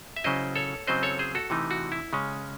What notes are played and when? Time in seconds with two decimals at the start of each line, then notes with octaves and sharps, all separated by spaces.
0.16 E5
0.24 C#3 F#3 C#4 E4 C5 D#5
0.56 A4 C#5
0.87 C#3 F#3 C4 E4 C5 D#5
1.03 A4 C#5
1.19 G#4 C5
1.35 F#4 A4
1.50 C3 E3 A3 D#4
1.71 F#4
1.92 E4
2.13 C#3 G#3 C#4